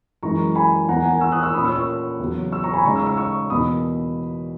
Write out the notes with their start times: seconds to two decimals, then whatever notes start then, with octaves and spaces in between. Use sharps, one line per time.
0.23 F#2 E3 G#3 A#5 C#6
0.55 G#5 B5
0.89 E2 D#3 A#3 F#5 A#5
0.97 G#5
1.05 F#5
1.13 G#5
1.21 C#6 E6
1.32 D#6 F#6
1.43 C#6 E6
1.54 A#2 A#3 C#4 B5 D#6
1.64 C#6 E6
1.76 C#6 E6
2.19 E2 C#3 F#3
2.52 C#6 E6
2.63 A#5 C#6
2.74 G#5 B5
2.85 C#3 G#3 D#4 A#5 C#6
2.95 C#6 E6
3.06 C#6 E6
3.17 C#6 E6
3.50 E2 B2 A#3 B5 D#6